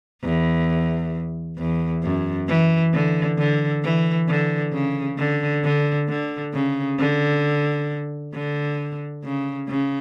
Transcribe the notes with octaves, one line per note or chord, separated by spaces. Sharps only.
E2
E2
F#2
E3
D3
D3
E3
D3
C#3
D3
D3
D3
C#3
D3
D3
C#3
C#3